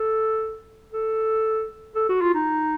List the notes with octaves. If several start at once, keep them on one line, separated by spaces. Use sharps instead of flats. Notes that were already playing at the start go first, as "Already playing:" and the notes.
Already playing: A4
A4
A4
F#4
F4
D#4